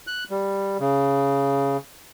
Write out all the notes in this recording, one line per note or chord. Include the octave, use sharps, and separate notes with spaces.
F#6
G3
C#3